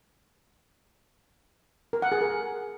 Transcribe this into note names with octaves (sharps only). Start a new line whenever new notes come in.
A#4
F#5
G#4
A#4